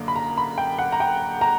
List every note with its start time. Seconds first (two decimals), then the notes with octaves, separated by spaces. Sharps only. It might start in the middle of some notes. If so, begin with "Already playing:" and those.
Already playing: F#2 D3 A#3
0.08 B5
0.16 A#5
0.38 B5
0.58 G5
0.79 F#5
0.92 A#5
1.00 G5
1.41 A#5